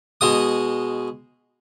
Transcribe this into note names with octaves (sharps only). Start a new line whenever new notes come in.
B2 G#3 D#6